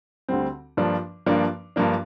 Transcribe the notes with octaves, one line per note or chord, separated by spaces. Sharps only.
D2 D3 G3 C4
G2 F3 A#3 D4
G2 F3 A#3 D4
G2 F3 A#3 D4